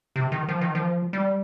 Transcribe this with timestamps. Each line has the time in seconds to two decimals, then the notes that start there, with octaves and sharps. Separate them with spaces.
0.16 C3
0.32 D#3
0.48 F3
0.61 D#3
0.75 F3
1.13 G3